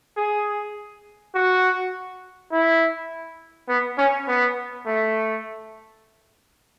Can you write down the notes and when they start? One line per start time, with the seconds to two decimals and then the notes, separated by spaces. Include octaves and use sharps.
0.17 G#4
1.35 F#4
2.52 E4
3.68 B3
3.98 C#4
4.28 B3
4.86 A3